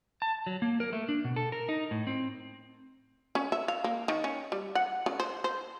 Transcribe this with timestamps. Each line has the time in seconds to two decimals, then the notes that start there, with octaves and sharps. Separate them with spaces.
0.22 A5
0.47 F#3
0.62 A#3
0.80 A#4
0.93 A3
1.09 D4
1.25 B2
1.36 A4
1.52 A#4
1.69 D#4
1.91 A2
2.07 C4
3.35 C#4
3.52 E5
3.68 F5
3.84 A#3
4.08 D#3
4.24 C#4
4.52 G3
4.75 F#5
5.06 C#3
5.20 C5
5.44 C5